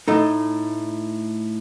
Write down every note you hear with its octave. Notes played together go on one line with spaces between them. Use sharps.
A2 A3 D#4